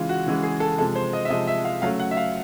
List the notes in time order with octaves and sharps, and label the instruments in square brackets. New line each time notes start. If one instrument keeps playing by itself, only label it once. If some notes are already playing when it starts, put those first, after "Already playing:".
Already playing: [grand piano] C#3 E3 G#3 F4
F#4
C#3 E3 G#3
G#4
A4
C3 F3 G#3 A4
C5
D#5
E5
C3 F3 G#3 D#5
E5
F5
C#3 F#3 A3 F5
F#5
E5
F5